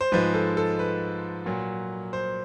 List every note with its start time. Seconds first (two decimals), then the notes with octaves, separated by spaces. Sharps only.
0.01 C5
0.12 G#2 F3 G#3 B4
0.34 A4
0.57 A4
0.79 B4
1.46 A#2 F#3
2.13 C5